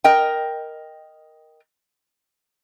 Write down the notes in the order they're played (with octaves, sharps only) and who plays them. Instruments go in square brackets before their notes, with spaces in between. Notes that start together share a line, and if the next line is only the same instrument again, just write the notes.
[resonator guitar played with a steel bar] A#4 D#5 G5